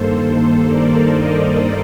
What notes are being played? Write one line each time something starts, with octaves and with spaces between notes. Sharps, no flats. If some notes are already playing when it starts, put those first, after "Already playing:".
Already playing: G2 D#3 A#3 A4 C5
A#4 D5
C5 D#5